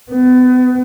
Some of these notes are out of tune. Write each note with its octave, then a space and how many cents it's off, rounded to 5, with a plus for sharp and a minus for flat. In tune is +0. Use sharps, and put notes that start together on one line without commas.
B3 +35